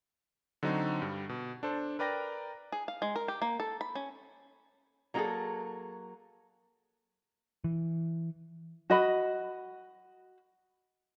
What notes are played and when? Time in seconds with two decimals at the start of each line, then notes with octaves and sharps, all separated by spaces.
0.63 D3 F#3 C4 D#4 F#4
1.02 G2 G3
1.29 B2
1.63 D4 A4 C5
1.99 A#4 B4 D5 G5 A#5 A#6
2.72 G#4
2.88 F5
3.02 G#3
3.16 A#4
3.28 G4
3.42 A#3
3.60 A4
3.81 B5
3.95 C#4
5.14 F#3 A#3 D#4 F4 G#4 A4
7.64 E3
8.90 F#4 D#5 B5